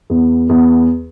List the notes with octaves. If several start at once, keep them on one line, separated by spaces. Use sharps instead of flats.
E2
E2